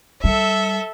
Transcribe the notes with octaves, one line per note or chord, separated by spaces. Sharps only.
G3 A4 E5